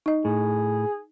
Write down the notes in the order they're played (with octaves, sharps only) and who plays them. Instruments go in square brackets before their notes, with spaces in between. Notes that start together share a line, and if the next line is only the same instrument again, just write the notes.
[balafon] D#4 D#5
[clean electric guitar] A2 [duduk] G#4